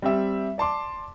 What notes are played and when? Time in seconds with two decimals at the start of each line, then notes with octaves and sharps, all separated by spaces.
0.02 G3 C4 G4 E5
0.58 D5 A5 C6 D6